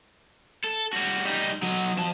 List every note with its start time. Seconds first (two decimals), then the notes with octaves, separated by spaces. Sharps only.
0.64 A4
0.93 G3 F#4
1.26 G3 D#4
1.63 F#3 D#5
1.98 F2 A5